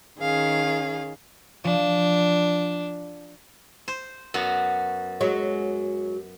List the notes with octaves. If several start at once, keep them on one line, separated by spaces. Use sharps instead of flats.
D#3 C#4 G#4 F5
F3 D4
C5
F#2 B3 F#4
F#3 G#3